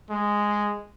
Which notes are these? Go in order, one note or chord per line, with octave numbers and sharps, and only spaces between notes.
G#3